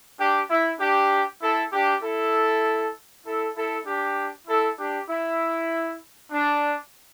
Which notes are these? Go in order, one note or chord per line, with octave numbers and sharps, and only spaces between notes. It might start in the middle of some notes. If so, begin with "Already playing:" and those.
D4 G4
E4
D4 G4
E4 A4
D4 G4
E4 A4
E4 A4
E4 A4
D4 G4
E4 A4
D4 G4
E4
D4